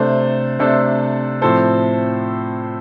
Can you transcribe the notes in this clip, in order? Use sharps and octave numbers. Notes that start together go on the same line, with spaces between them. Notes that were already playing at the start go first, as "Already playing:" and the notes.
Already playing: C3 A3 D4 A4 C5
C3 A3 D4 A4 C5
A2 F3 C4 A4 C5